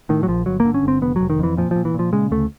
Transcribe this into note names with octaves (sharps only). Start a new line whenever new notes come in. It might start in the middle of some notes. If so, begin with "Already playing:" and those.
A2 D#3
F#3
A#1 F3
G1 F#3
A#3
D3
C#4
G1 C4
F1 B3
F#3
F1
D#3
F2 E3
A#2 F3
A#2 F3
E3
A#2 F3
C#3 G#3
D2 A3